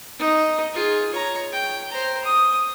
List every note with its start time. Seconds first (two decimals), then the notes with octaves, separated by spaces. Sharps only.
0.19 D#4
0.74 F4 G#4
1.12 C#5 A#5
1.52 G5
1.91 C5 A#5
2.24 D#6